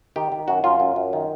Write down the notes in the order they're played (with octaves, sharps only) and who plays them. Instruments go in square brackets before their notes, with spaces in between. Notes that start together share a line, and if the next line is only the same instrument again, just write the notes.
[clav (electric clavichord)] D#3 G4
D#3
F#2 F#4
F#2 F4
F#2
F#2
D#3